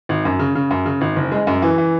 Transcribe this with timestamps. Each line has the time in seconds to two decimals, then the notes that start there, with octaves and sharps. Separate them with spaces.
0.09 G#1
0.25 F#2
0.39 C#3
0.55 C#3
0.71 F#2
0.86 C#3
1.01 G#1
1.16 F#1
1.32 G#3
1.47 F#2
1.62 E3
1.78 E3